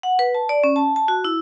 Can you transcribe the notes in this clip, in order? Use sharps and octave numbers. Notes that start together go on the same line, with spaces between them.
F#5
B4
A5
D5
C#4
A5
A5
F#4
E4